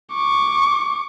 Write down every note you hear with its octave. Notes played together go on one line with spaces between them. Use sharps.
C#6 D6